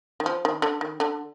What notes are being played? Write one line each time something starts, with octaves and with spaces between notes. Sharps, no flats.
D#3
F3
D#3
D3
D#3
D3